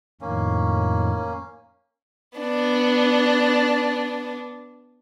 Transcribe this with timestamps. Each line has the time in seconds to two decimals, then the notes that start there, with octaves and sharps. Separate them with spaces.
0.21 F2 A2 D#3 A#3 C#4
2.38 B3 D4